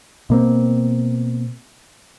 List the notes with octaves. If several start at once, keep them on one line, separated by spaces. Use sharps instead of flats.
B2 A#3 C4